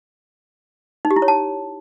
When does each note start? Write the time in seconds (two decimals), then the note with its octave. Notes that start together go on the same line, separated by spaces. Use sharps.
1.05 D#4
1.11 G4
1.16 E4
1.22 C#5
1.28 A5